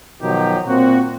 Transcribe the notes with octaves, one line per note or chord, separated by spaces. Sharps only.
B2 D#3 F3 F#3 D#4 G4
A#2 C4 F#4